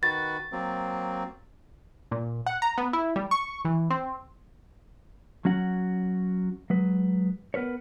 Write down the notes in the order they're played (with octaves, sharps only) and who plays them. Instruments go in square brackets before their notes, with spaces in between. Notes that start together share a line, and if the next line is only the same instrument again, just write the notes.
[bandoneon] D#3 F#4 B4 [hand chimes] A6
[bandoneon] F#3 A#3 C4
[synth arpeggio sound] A#2
F#5
A#5
B3
E4
G3
C#6
E3
C4
[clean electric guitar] F#3 C#4 F#4 F#5
F#3 G#3 B4
B3 A#4 B4 C#5